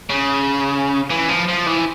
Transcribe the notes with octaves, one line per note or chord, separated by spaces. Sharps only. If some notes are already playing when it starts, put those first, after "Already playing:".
C#3
E3
F3
F3
E3